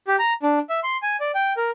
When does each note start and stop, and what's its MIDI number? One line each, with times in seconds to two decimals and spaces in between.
0.08 0.16 67
0.19 0.33 82
0.43 0.59 62
0.70 0.80 76
0.83 0.97 84
1.03 1.17 80
1.20 1.32 74
1.35 1.53 79
1.57 1.71 70